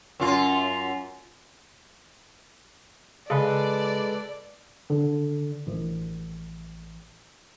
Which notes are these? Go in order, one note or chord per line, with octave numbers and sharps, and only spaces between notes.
F#2 F4
C#3 G#3 A4 B4 D5
D3
A1